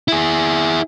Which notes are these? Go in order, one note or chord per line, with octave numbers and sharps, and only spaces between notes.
E4 G#4